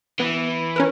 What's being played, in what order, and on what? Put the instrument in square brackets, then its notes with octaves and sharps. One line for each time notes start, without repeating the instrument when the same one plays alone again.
[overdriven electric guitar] E3 [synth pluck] B3
[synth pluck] C#4 A#4 B4